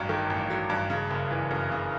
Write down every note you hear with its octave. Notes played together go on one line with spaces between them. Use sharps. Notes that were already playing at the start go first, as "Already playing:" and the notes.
Already playing: A1 G2 F#3
D#3
A1
F#3
G2
C#3
F#1
E3
F#2
C#3